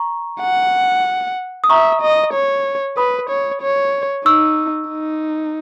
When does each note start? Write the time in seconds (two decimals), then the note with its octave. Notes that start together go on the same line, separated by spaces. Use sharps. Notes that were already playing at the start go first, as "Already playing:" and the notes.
Already playing: A#5 C#6
0.41 F#5
1.64 D#6
1.70 E5 A#5 C#6
2.02 D#5
2.33 C#5
2.97 B4 B5 D#6
3.30 C#5
3.62 C#5
4.25 D#4 C#6 E6
4.90 D#4